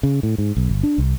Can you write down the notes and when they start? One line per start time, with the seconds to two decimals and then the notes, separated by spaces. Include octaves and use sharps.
0.03 C#3
0.23 A2
0.38 G#2
0.57 B1
0.69 G1
0.83 D4
0.98 C2